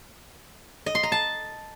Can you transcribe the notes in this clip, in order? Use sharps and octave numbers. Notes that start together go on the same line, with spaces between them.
D#5
C6
A#5
A5